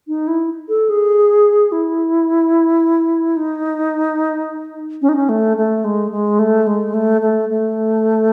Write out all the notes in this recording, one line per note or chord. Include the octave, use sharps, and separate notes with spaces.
D#4
E4
A4
G#4
E4
D#4
C#4
D#4
C#4
A3
A3
G#3
G#3
A3
G#3
A3
A3
A3